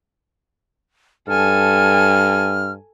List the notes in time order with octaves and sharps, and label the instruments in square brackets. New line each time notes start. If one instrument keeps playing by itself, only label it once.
[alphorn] G2 [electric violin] A4 G#5 [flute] F6